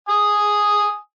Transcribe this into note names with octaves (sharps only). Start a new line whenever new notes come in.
G#5 D#6